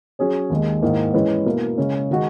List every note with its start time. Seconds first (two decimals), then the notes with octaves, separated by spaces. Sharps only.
0.19 F#3 C#4 G#4 C#5
0.50 D#2 D#3 G#3
0.83 G#2 D#3 A#3 E4
1.14 E3 G#3 C#4 E4 B4
1.45 B2 A#3 E4 A#4
1.78 C#3 G#3 C#4
2.11 D#3 G#3 D#4 F#4